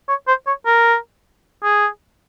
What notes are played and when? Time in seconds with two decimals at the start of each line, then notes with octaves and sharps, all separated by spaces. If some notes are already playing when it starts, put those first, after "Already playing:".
0.09 C#5
0.28 C5
0.47 C#5
0.66 A#4
1.63 G#4